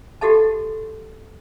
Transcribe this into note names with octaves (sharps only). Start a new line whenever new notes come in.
F#4 G4 A4 E5 A5